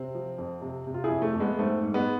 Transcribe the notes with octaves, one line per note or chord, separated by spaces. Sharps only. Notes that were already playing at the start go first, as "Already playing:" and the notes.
Already playing: C3 C4
F3
F2
C3
C3
F4
E4 G#4
F2
A3
F2
G#3 B3
G#2 A3 C4
G#2
G#3 B3